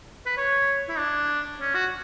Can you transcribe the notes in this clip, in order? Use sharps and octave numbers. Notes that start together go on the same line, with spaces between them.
B4
C#5
E4
D4
C#4
F#4